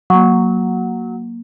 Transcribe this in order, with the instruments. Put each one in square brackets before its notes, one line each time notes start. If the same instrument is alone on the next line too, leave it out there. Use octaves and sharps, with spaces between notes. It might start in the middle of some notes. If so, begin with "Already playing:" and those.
[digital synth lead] F#3 [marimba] A#3 C#6